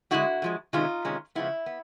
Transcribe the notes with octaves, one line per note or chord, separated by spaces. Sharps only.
D3 F3 G#3 E4 F#4
D3 F3 G#3
C3 D#3 G#3 C#4 D#4 F4
C3 D#3 G#3 C#4
C#3 F3 G#3 B3 E4
B3